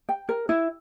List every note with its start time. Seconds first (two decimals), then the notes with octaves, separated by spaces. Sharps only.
0.09 G5
0.29 A#4
0.49 E4